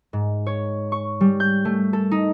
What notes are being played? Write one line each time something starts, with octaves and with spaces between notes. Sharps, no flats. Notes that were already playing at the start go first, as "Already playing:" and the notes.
G#2
C#5
C#6
G3
G6
A3
A4
D#4